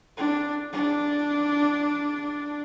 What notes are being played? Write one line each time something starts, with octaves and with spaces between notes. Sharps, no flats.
D4
D4